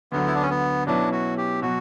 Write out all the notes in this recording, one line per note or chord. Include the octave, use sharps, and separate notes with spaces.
D2 D3 F#3 B3
E4
D4
C#4
B3
B2 F#3 C#4 D4 E4 B4
F#4
G4
B2 F#3 F#4